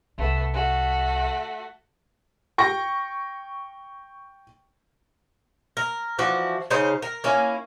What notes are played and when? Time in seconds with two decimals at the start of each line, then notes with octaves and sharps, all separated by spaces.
0.18 C2 A3 B3
0.54 A3 F#4
2.58 G5 C#6 A#6
5.77 A#4
6.19 E3 F3 F#4 D5
6.70 C#3 D#4 C5
7.02 A#4
7.24 A#3 C#4 E4